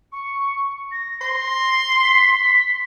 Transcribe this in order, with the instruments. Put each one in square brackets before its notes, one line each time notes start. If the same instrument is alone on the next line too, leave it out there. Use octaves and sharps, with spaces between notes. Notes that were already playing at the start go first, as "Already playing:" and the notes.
[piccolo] C#6
A#6
[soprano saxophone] C6
[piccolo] B6